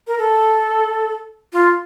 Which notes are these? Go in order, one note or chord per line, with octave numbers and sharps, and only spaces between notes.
A#4
A4
F4